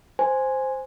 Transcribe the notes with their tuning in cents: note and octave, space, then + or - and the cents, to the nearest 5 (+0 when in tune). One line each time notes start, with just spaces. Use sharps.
C5 +0 G#5 +0